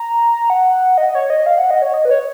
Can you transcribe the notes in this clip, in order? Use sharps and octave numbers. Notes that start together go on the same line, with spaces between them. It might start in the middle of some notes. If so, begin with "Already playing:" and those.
Already playing: A#5
F#5
D#5
C#5
D#5
F5
F#5
D#5
C#5
D#5
B4
C#5